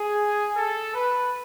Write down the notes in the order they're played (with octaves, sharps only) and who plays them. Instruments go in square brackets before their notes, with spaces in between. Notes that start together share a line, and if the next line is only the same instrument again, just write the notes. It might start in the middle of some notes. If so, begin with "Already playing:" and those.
Already playing: [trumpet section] G#4
A4
B4